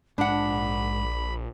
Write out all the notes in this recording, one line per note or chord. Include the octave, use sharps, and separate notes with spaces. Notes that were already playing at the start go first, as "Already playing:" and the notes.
A#1 G#2 D4 F#5 B5